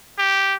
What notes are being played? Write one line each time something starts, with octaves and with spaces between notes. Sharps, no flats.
G4